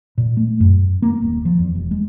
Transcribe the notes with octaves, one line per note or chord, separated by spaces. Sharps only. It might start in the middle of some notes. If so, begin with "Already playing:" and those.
A#2
A3
F#2
A#3
D#1
F3
E2
E1
G#3